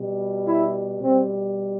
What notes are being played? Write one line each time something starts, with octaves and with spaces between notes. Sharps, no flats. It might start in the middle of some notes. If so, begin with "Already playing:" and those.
Already playing: B2 G3
E4
B2 G3 C4